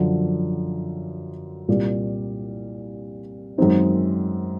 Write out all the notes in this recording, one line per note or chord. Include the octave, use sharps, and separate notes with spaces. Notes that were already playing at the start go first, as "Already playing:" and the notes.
Already playing: F#2 D3 F3
C2 A#2 G3
F#2 D#3 G#3 C4 D#4